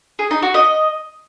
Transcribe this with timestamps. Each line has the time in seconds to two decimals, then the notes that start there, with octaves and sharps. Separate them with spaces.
0.19 G#4
0.31 D#4
0.43 F#4
0.54 D#5